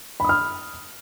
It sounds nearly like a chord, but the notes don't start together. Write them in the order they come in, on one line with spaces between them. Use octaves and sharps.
B5 D#6 F6